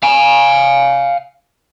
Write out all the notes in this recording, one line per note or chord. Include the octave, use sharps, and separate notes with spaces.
F5 G#5